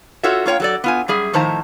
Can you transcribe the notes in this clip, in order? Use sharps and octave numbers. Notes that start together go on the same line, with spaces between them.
F4 F#4 A4 C#5 E5
A#3 F4 C#5 G5
F#3 A4 D5
B3 F4 G#5
F#2 G3 G#4 E5
A2 D#3 F3 C5 A5 A#5